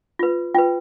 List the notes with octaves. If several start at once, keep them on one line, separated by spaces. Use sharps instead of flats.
F4 B4
F4 B4 G5